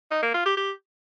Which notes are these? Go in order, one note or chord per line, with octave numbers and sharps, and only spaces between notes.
D#4
A#3
F4
G4
G4